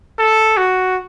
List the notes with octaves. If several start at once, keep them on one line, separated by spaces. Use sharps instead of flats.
A4
F#4